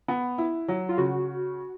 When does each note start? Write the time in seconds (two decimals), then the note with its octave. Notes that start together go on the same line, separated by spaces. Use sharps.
0.08 B3
0.38 E4
0.68 F#3
0.89 F4
0.97 C#3 F#4